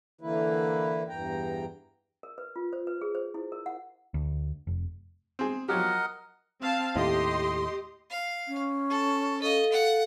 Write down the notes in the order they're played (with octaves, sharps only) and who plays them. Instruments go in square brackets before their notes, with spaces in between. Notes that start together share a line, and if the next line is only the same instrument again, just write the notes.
[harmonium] D3 E3 A#3 E4 B4
E2 G2 E3 G5 A#5
[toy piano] A#4
B4
F4
C5
B4
G#4
C5
E4
A#4
F#5
[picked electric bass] D2
F1
[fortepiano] C4 G#4
[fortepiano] F3 F#3 G4 [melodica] A#4 D#5 F#5
[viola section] C4 F5 A5
[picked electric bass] D#2 A2 [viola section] G4 D#5 C6
[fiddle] F5
[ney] C#4
[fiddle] A4
[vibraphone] A4 F5 [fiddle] D#5
[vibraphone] A4 F5 [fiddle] F#5